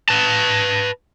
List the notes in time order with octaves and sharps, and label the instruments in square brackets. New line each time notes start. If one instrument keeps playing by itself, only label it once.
[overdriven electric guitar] B4 A5